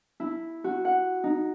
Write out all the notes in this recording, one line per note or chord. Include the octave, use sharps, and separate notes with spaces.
E4
F#4
F#5
D#4